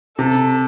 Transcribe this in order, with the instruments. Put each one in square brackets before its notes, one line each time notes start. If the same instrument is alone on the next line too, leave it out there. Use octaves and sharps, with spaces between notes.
[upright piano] C3 [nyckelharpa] A4